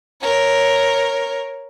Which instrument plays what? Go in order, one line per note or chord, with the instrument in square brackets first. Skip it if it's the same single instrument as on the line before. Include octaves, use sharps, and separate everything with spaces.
[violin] A#4 C#5